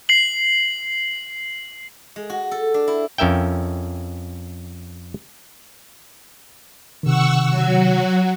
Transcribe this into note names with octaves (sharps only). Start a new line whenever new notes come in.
C7 F#7
G#3
F#4
A4
D4
E4
F2 C#4 A#4 E5 G5
C3 D#3 F#5 C#6 E6
F#3 F#4